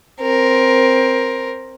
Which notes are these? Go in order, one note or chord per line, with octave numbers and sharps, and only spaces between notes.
C4 A#4